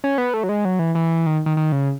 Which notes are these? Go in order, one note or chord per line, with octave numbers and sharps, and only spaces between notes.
C#4
B3
A3
F#3
G#3
F#3
E3
E3
D#3
D#3
D#3
C#3